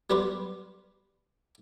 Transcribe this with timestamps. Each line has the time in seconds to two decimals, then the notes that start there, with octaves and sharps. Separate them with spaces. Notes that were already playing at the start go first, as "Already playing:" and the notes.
0.10 G3 B3 G4 A#4 B4 C6